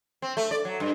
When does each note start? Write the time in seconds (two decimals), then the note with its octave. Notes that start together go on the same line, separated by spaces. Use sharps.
0.22 C4
0.37 A3
0.51 D5
0.65 F#3
0.80 G2